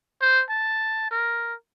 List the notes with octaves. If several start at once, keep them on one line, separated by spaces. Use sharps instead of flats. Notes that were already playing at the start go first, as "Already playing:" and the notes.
C5
A5
A#4